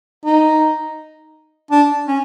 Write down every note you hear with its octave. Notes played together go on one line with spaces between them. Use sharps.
D#4
D4
C#4